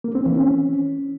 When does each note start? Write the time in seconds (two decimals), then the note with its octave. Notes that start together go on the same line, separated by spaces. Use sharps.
0.04 A#3
0.15 C4
0.26 E3
0.37 C#4